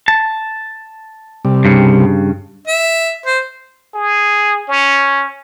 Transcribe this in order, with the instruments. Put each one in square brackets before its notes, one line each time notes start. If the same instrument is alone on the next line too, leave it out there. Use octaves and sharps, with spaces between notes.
[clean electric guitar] A5
[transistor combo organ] C3 G3
[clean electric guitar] G2 C#3
[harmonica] E5
C5
[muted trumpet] G#4
C#4